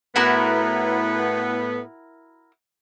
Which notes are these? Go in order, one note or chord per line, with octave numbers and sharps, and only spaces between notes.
A2 B3 E4 F#4 A#4